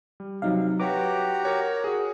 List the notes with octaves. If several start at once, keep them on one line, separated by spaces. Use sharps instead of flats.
G3
C3 F#3 D#4 F5
F#4 G4 B4 C#5 A#5 D6
A#4 C#5 F#5
F#4 G#4